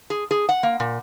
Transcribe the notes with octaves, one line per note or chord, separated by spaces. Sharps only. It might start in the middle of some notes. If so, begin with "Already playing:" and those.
G#4
G#4
F#5
A#3
A#2